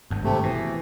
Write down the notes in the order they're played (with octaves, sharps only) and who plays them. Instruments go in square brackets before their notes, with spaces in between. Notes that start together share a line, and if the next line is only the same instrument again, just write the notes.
[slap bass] G#1 G2
[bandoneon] C3 A3
[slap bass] B2 [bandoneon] E3